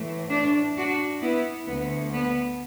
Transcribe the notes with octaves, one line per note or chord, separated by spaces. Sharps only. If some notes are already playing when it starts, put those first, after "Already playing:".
Already playing: A2 E3 A3
A3 D4
D4 F#4
B3 E4
D2 D3 A3 B3
B3